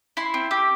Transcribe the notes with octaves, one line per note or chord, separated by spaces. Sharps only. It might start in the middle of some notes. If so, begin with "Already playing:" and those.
E4 C6
C4
G4